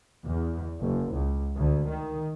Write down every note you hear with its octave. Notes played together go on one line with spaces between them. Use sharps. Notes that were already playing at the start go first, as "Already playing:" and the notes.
E2
F#1
C#2
D2
D#3